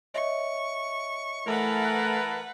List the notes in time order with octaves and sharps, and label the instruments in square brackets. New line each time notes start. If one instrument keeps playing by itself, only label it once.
[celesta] C#5 D#5 E5 [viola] C#6
[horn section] E3 A#4 A5 [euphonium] A3 [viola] B4 F#5